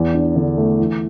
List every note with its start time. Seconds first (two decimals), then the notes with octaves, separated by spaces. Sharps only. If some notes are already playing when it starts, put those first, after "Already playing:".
Already playing: E2
0.14 D4
0.36 D3
0.58 A3
0.79 E3